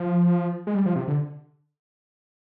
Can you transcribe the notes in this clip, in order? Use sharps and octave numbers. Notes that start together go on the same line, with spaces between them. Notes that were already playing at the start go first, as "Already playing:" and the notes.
Already playing: F3
G#3
G3
F3
C3
D3